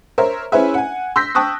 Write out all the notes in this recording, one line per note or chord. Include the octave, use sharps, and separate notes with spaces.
A#4 C5 C#5 E5
C#4 E4 G#4 B4 C5 E5
F#5 G#5
C6 E6 G6 A#6 B6
G5 A5 C#6 D#6 F#6